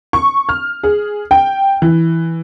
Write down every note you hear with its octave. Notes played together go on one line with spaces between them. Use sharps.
C#6
F6
G#4
G5
E3